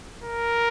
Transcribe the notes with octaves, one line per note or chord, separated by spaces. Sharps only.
A#4